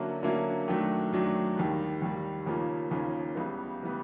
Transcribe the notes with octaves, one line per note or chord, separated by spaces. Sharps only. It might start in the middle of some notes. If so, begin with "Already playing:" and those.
Already playing: D3 F#3 A#3 C#4 E4
D3 F#3 A#3 C#4 E4
F#2 D#3 F#3 A3 D4
F#2 D#3 F#3 A3 D4
D#2 D#3 G3
D#2 D#3 G3
D#2 C#3 F3 A#3 C#4
D#2 C#3 F3 A#3 C#4
C#2 C#3 E3 G3 B3
C#3 E3 G3 B3